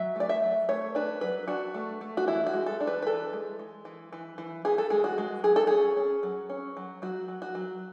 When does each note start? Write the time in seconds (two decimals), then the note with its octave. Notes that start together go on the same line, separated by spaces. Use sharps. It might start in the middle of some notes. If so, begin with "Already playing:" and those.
Already playing: F#3 E5
0.16 A3 D5
0.29 E5
0.43 F#3
0.69 A3 C#5
0.95 D4 B4
1.21 F#3 B4
1.48 D4 F#4
1.74 A3
2.01 A3
2.17 F#4
2.27 E3 E4
2.47 F#4
2.53 G#3
2.66 A4
2.80 D4
2.87 B4
3.02 B4
3.06 E3 A4
3.33 G#3
3.59 G#3
3.85 E3
4.12 E3
4.38 E3
4.65 E3 G#4
4.78 A4
4.90 G#3 G#4
5.04 F#4
5.18 G#3
5.44 F#3 G#4
5.56 A4
5.67 C#4 G#4
5.97 C#4
6.23 F#3
6.49 C#4
6.77 F#3
7.02 F#3 F#4
7.28 F#3
7.42 F#4
7.55 F#3